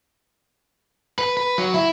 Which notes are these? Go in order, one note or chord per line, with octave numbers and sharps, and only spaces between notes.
B4
B4
F#3
E4